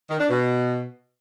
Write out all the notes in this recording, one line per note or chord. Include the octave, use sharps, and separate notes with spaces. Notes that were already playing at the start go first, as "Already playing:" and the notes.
D#3
D4
B2